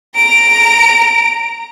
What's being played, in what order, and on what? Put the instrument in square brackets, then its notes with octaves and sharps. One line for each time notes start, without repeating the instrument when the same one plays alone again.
[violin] A#5 D7